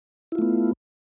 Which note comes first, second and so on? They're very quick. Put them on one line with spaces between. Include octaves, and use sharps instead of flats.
E4 F4 A3 B3